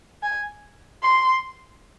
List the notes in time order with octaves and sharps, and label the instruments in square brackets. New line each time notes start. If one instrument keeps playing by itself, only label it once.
[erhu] G#5
C6